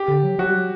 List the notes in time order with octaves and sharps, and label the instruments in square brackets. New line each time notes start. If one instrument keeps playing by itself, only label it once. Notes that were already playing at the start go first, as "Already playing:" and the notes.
Already playing: [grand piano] G4
[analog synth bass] D3
F#3
[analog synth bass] F#3 [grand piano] F#4
[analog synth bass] G3
F#3